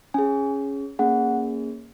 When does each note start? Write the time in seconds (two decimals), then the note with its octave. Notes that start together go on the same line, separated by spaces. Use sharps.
0.14 C#4 G#4 G#5
0.99 A#3 C#4 G#4 F#5